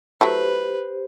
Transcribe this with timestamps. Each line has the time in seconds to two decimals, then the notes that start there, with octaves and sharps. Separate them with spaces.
0.21 F#3 A3 E4 G4 B4 C5